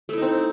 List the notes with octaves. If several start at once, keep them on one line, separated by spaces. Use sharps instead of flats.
A3 C4 D#4 E4